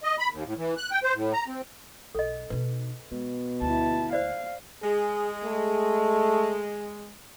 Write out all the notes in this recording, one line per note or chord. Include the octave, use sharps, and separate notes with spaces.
D#5
B5
D#2
A2
E3
F#6
G5
C5
A2
A#5
C4
B1 A4 D#5
B2 D#4 B4
B2 G#3
D2 E4 A5
C5 D5 F5
G#3 G#4
A3